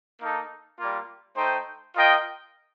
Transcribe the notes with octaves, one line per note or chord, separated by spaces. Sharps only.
A#3 D#4 A4
G3 A#3 F4
A3 D#4 A4 C5 G5
F4 A#4 D#5 G5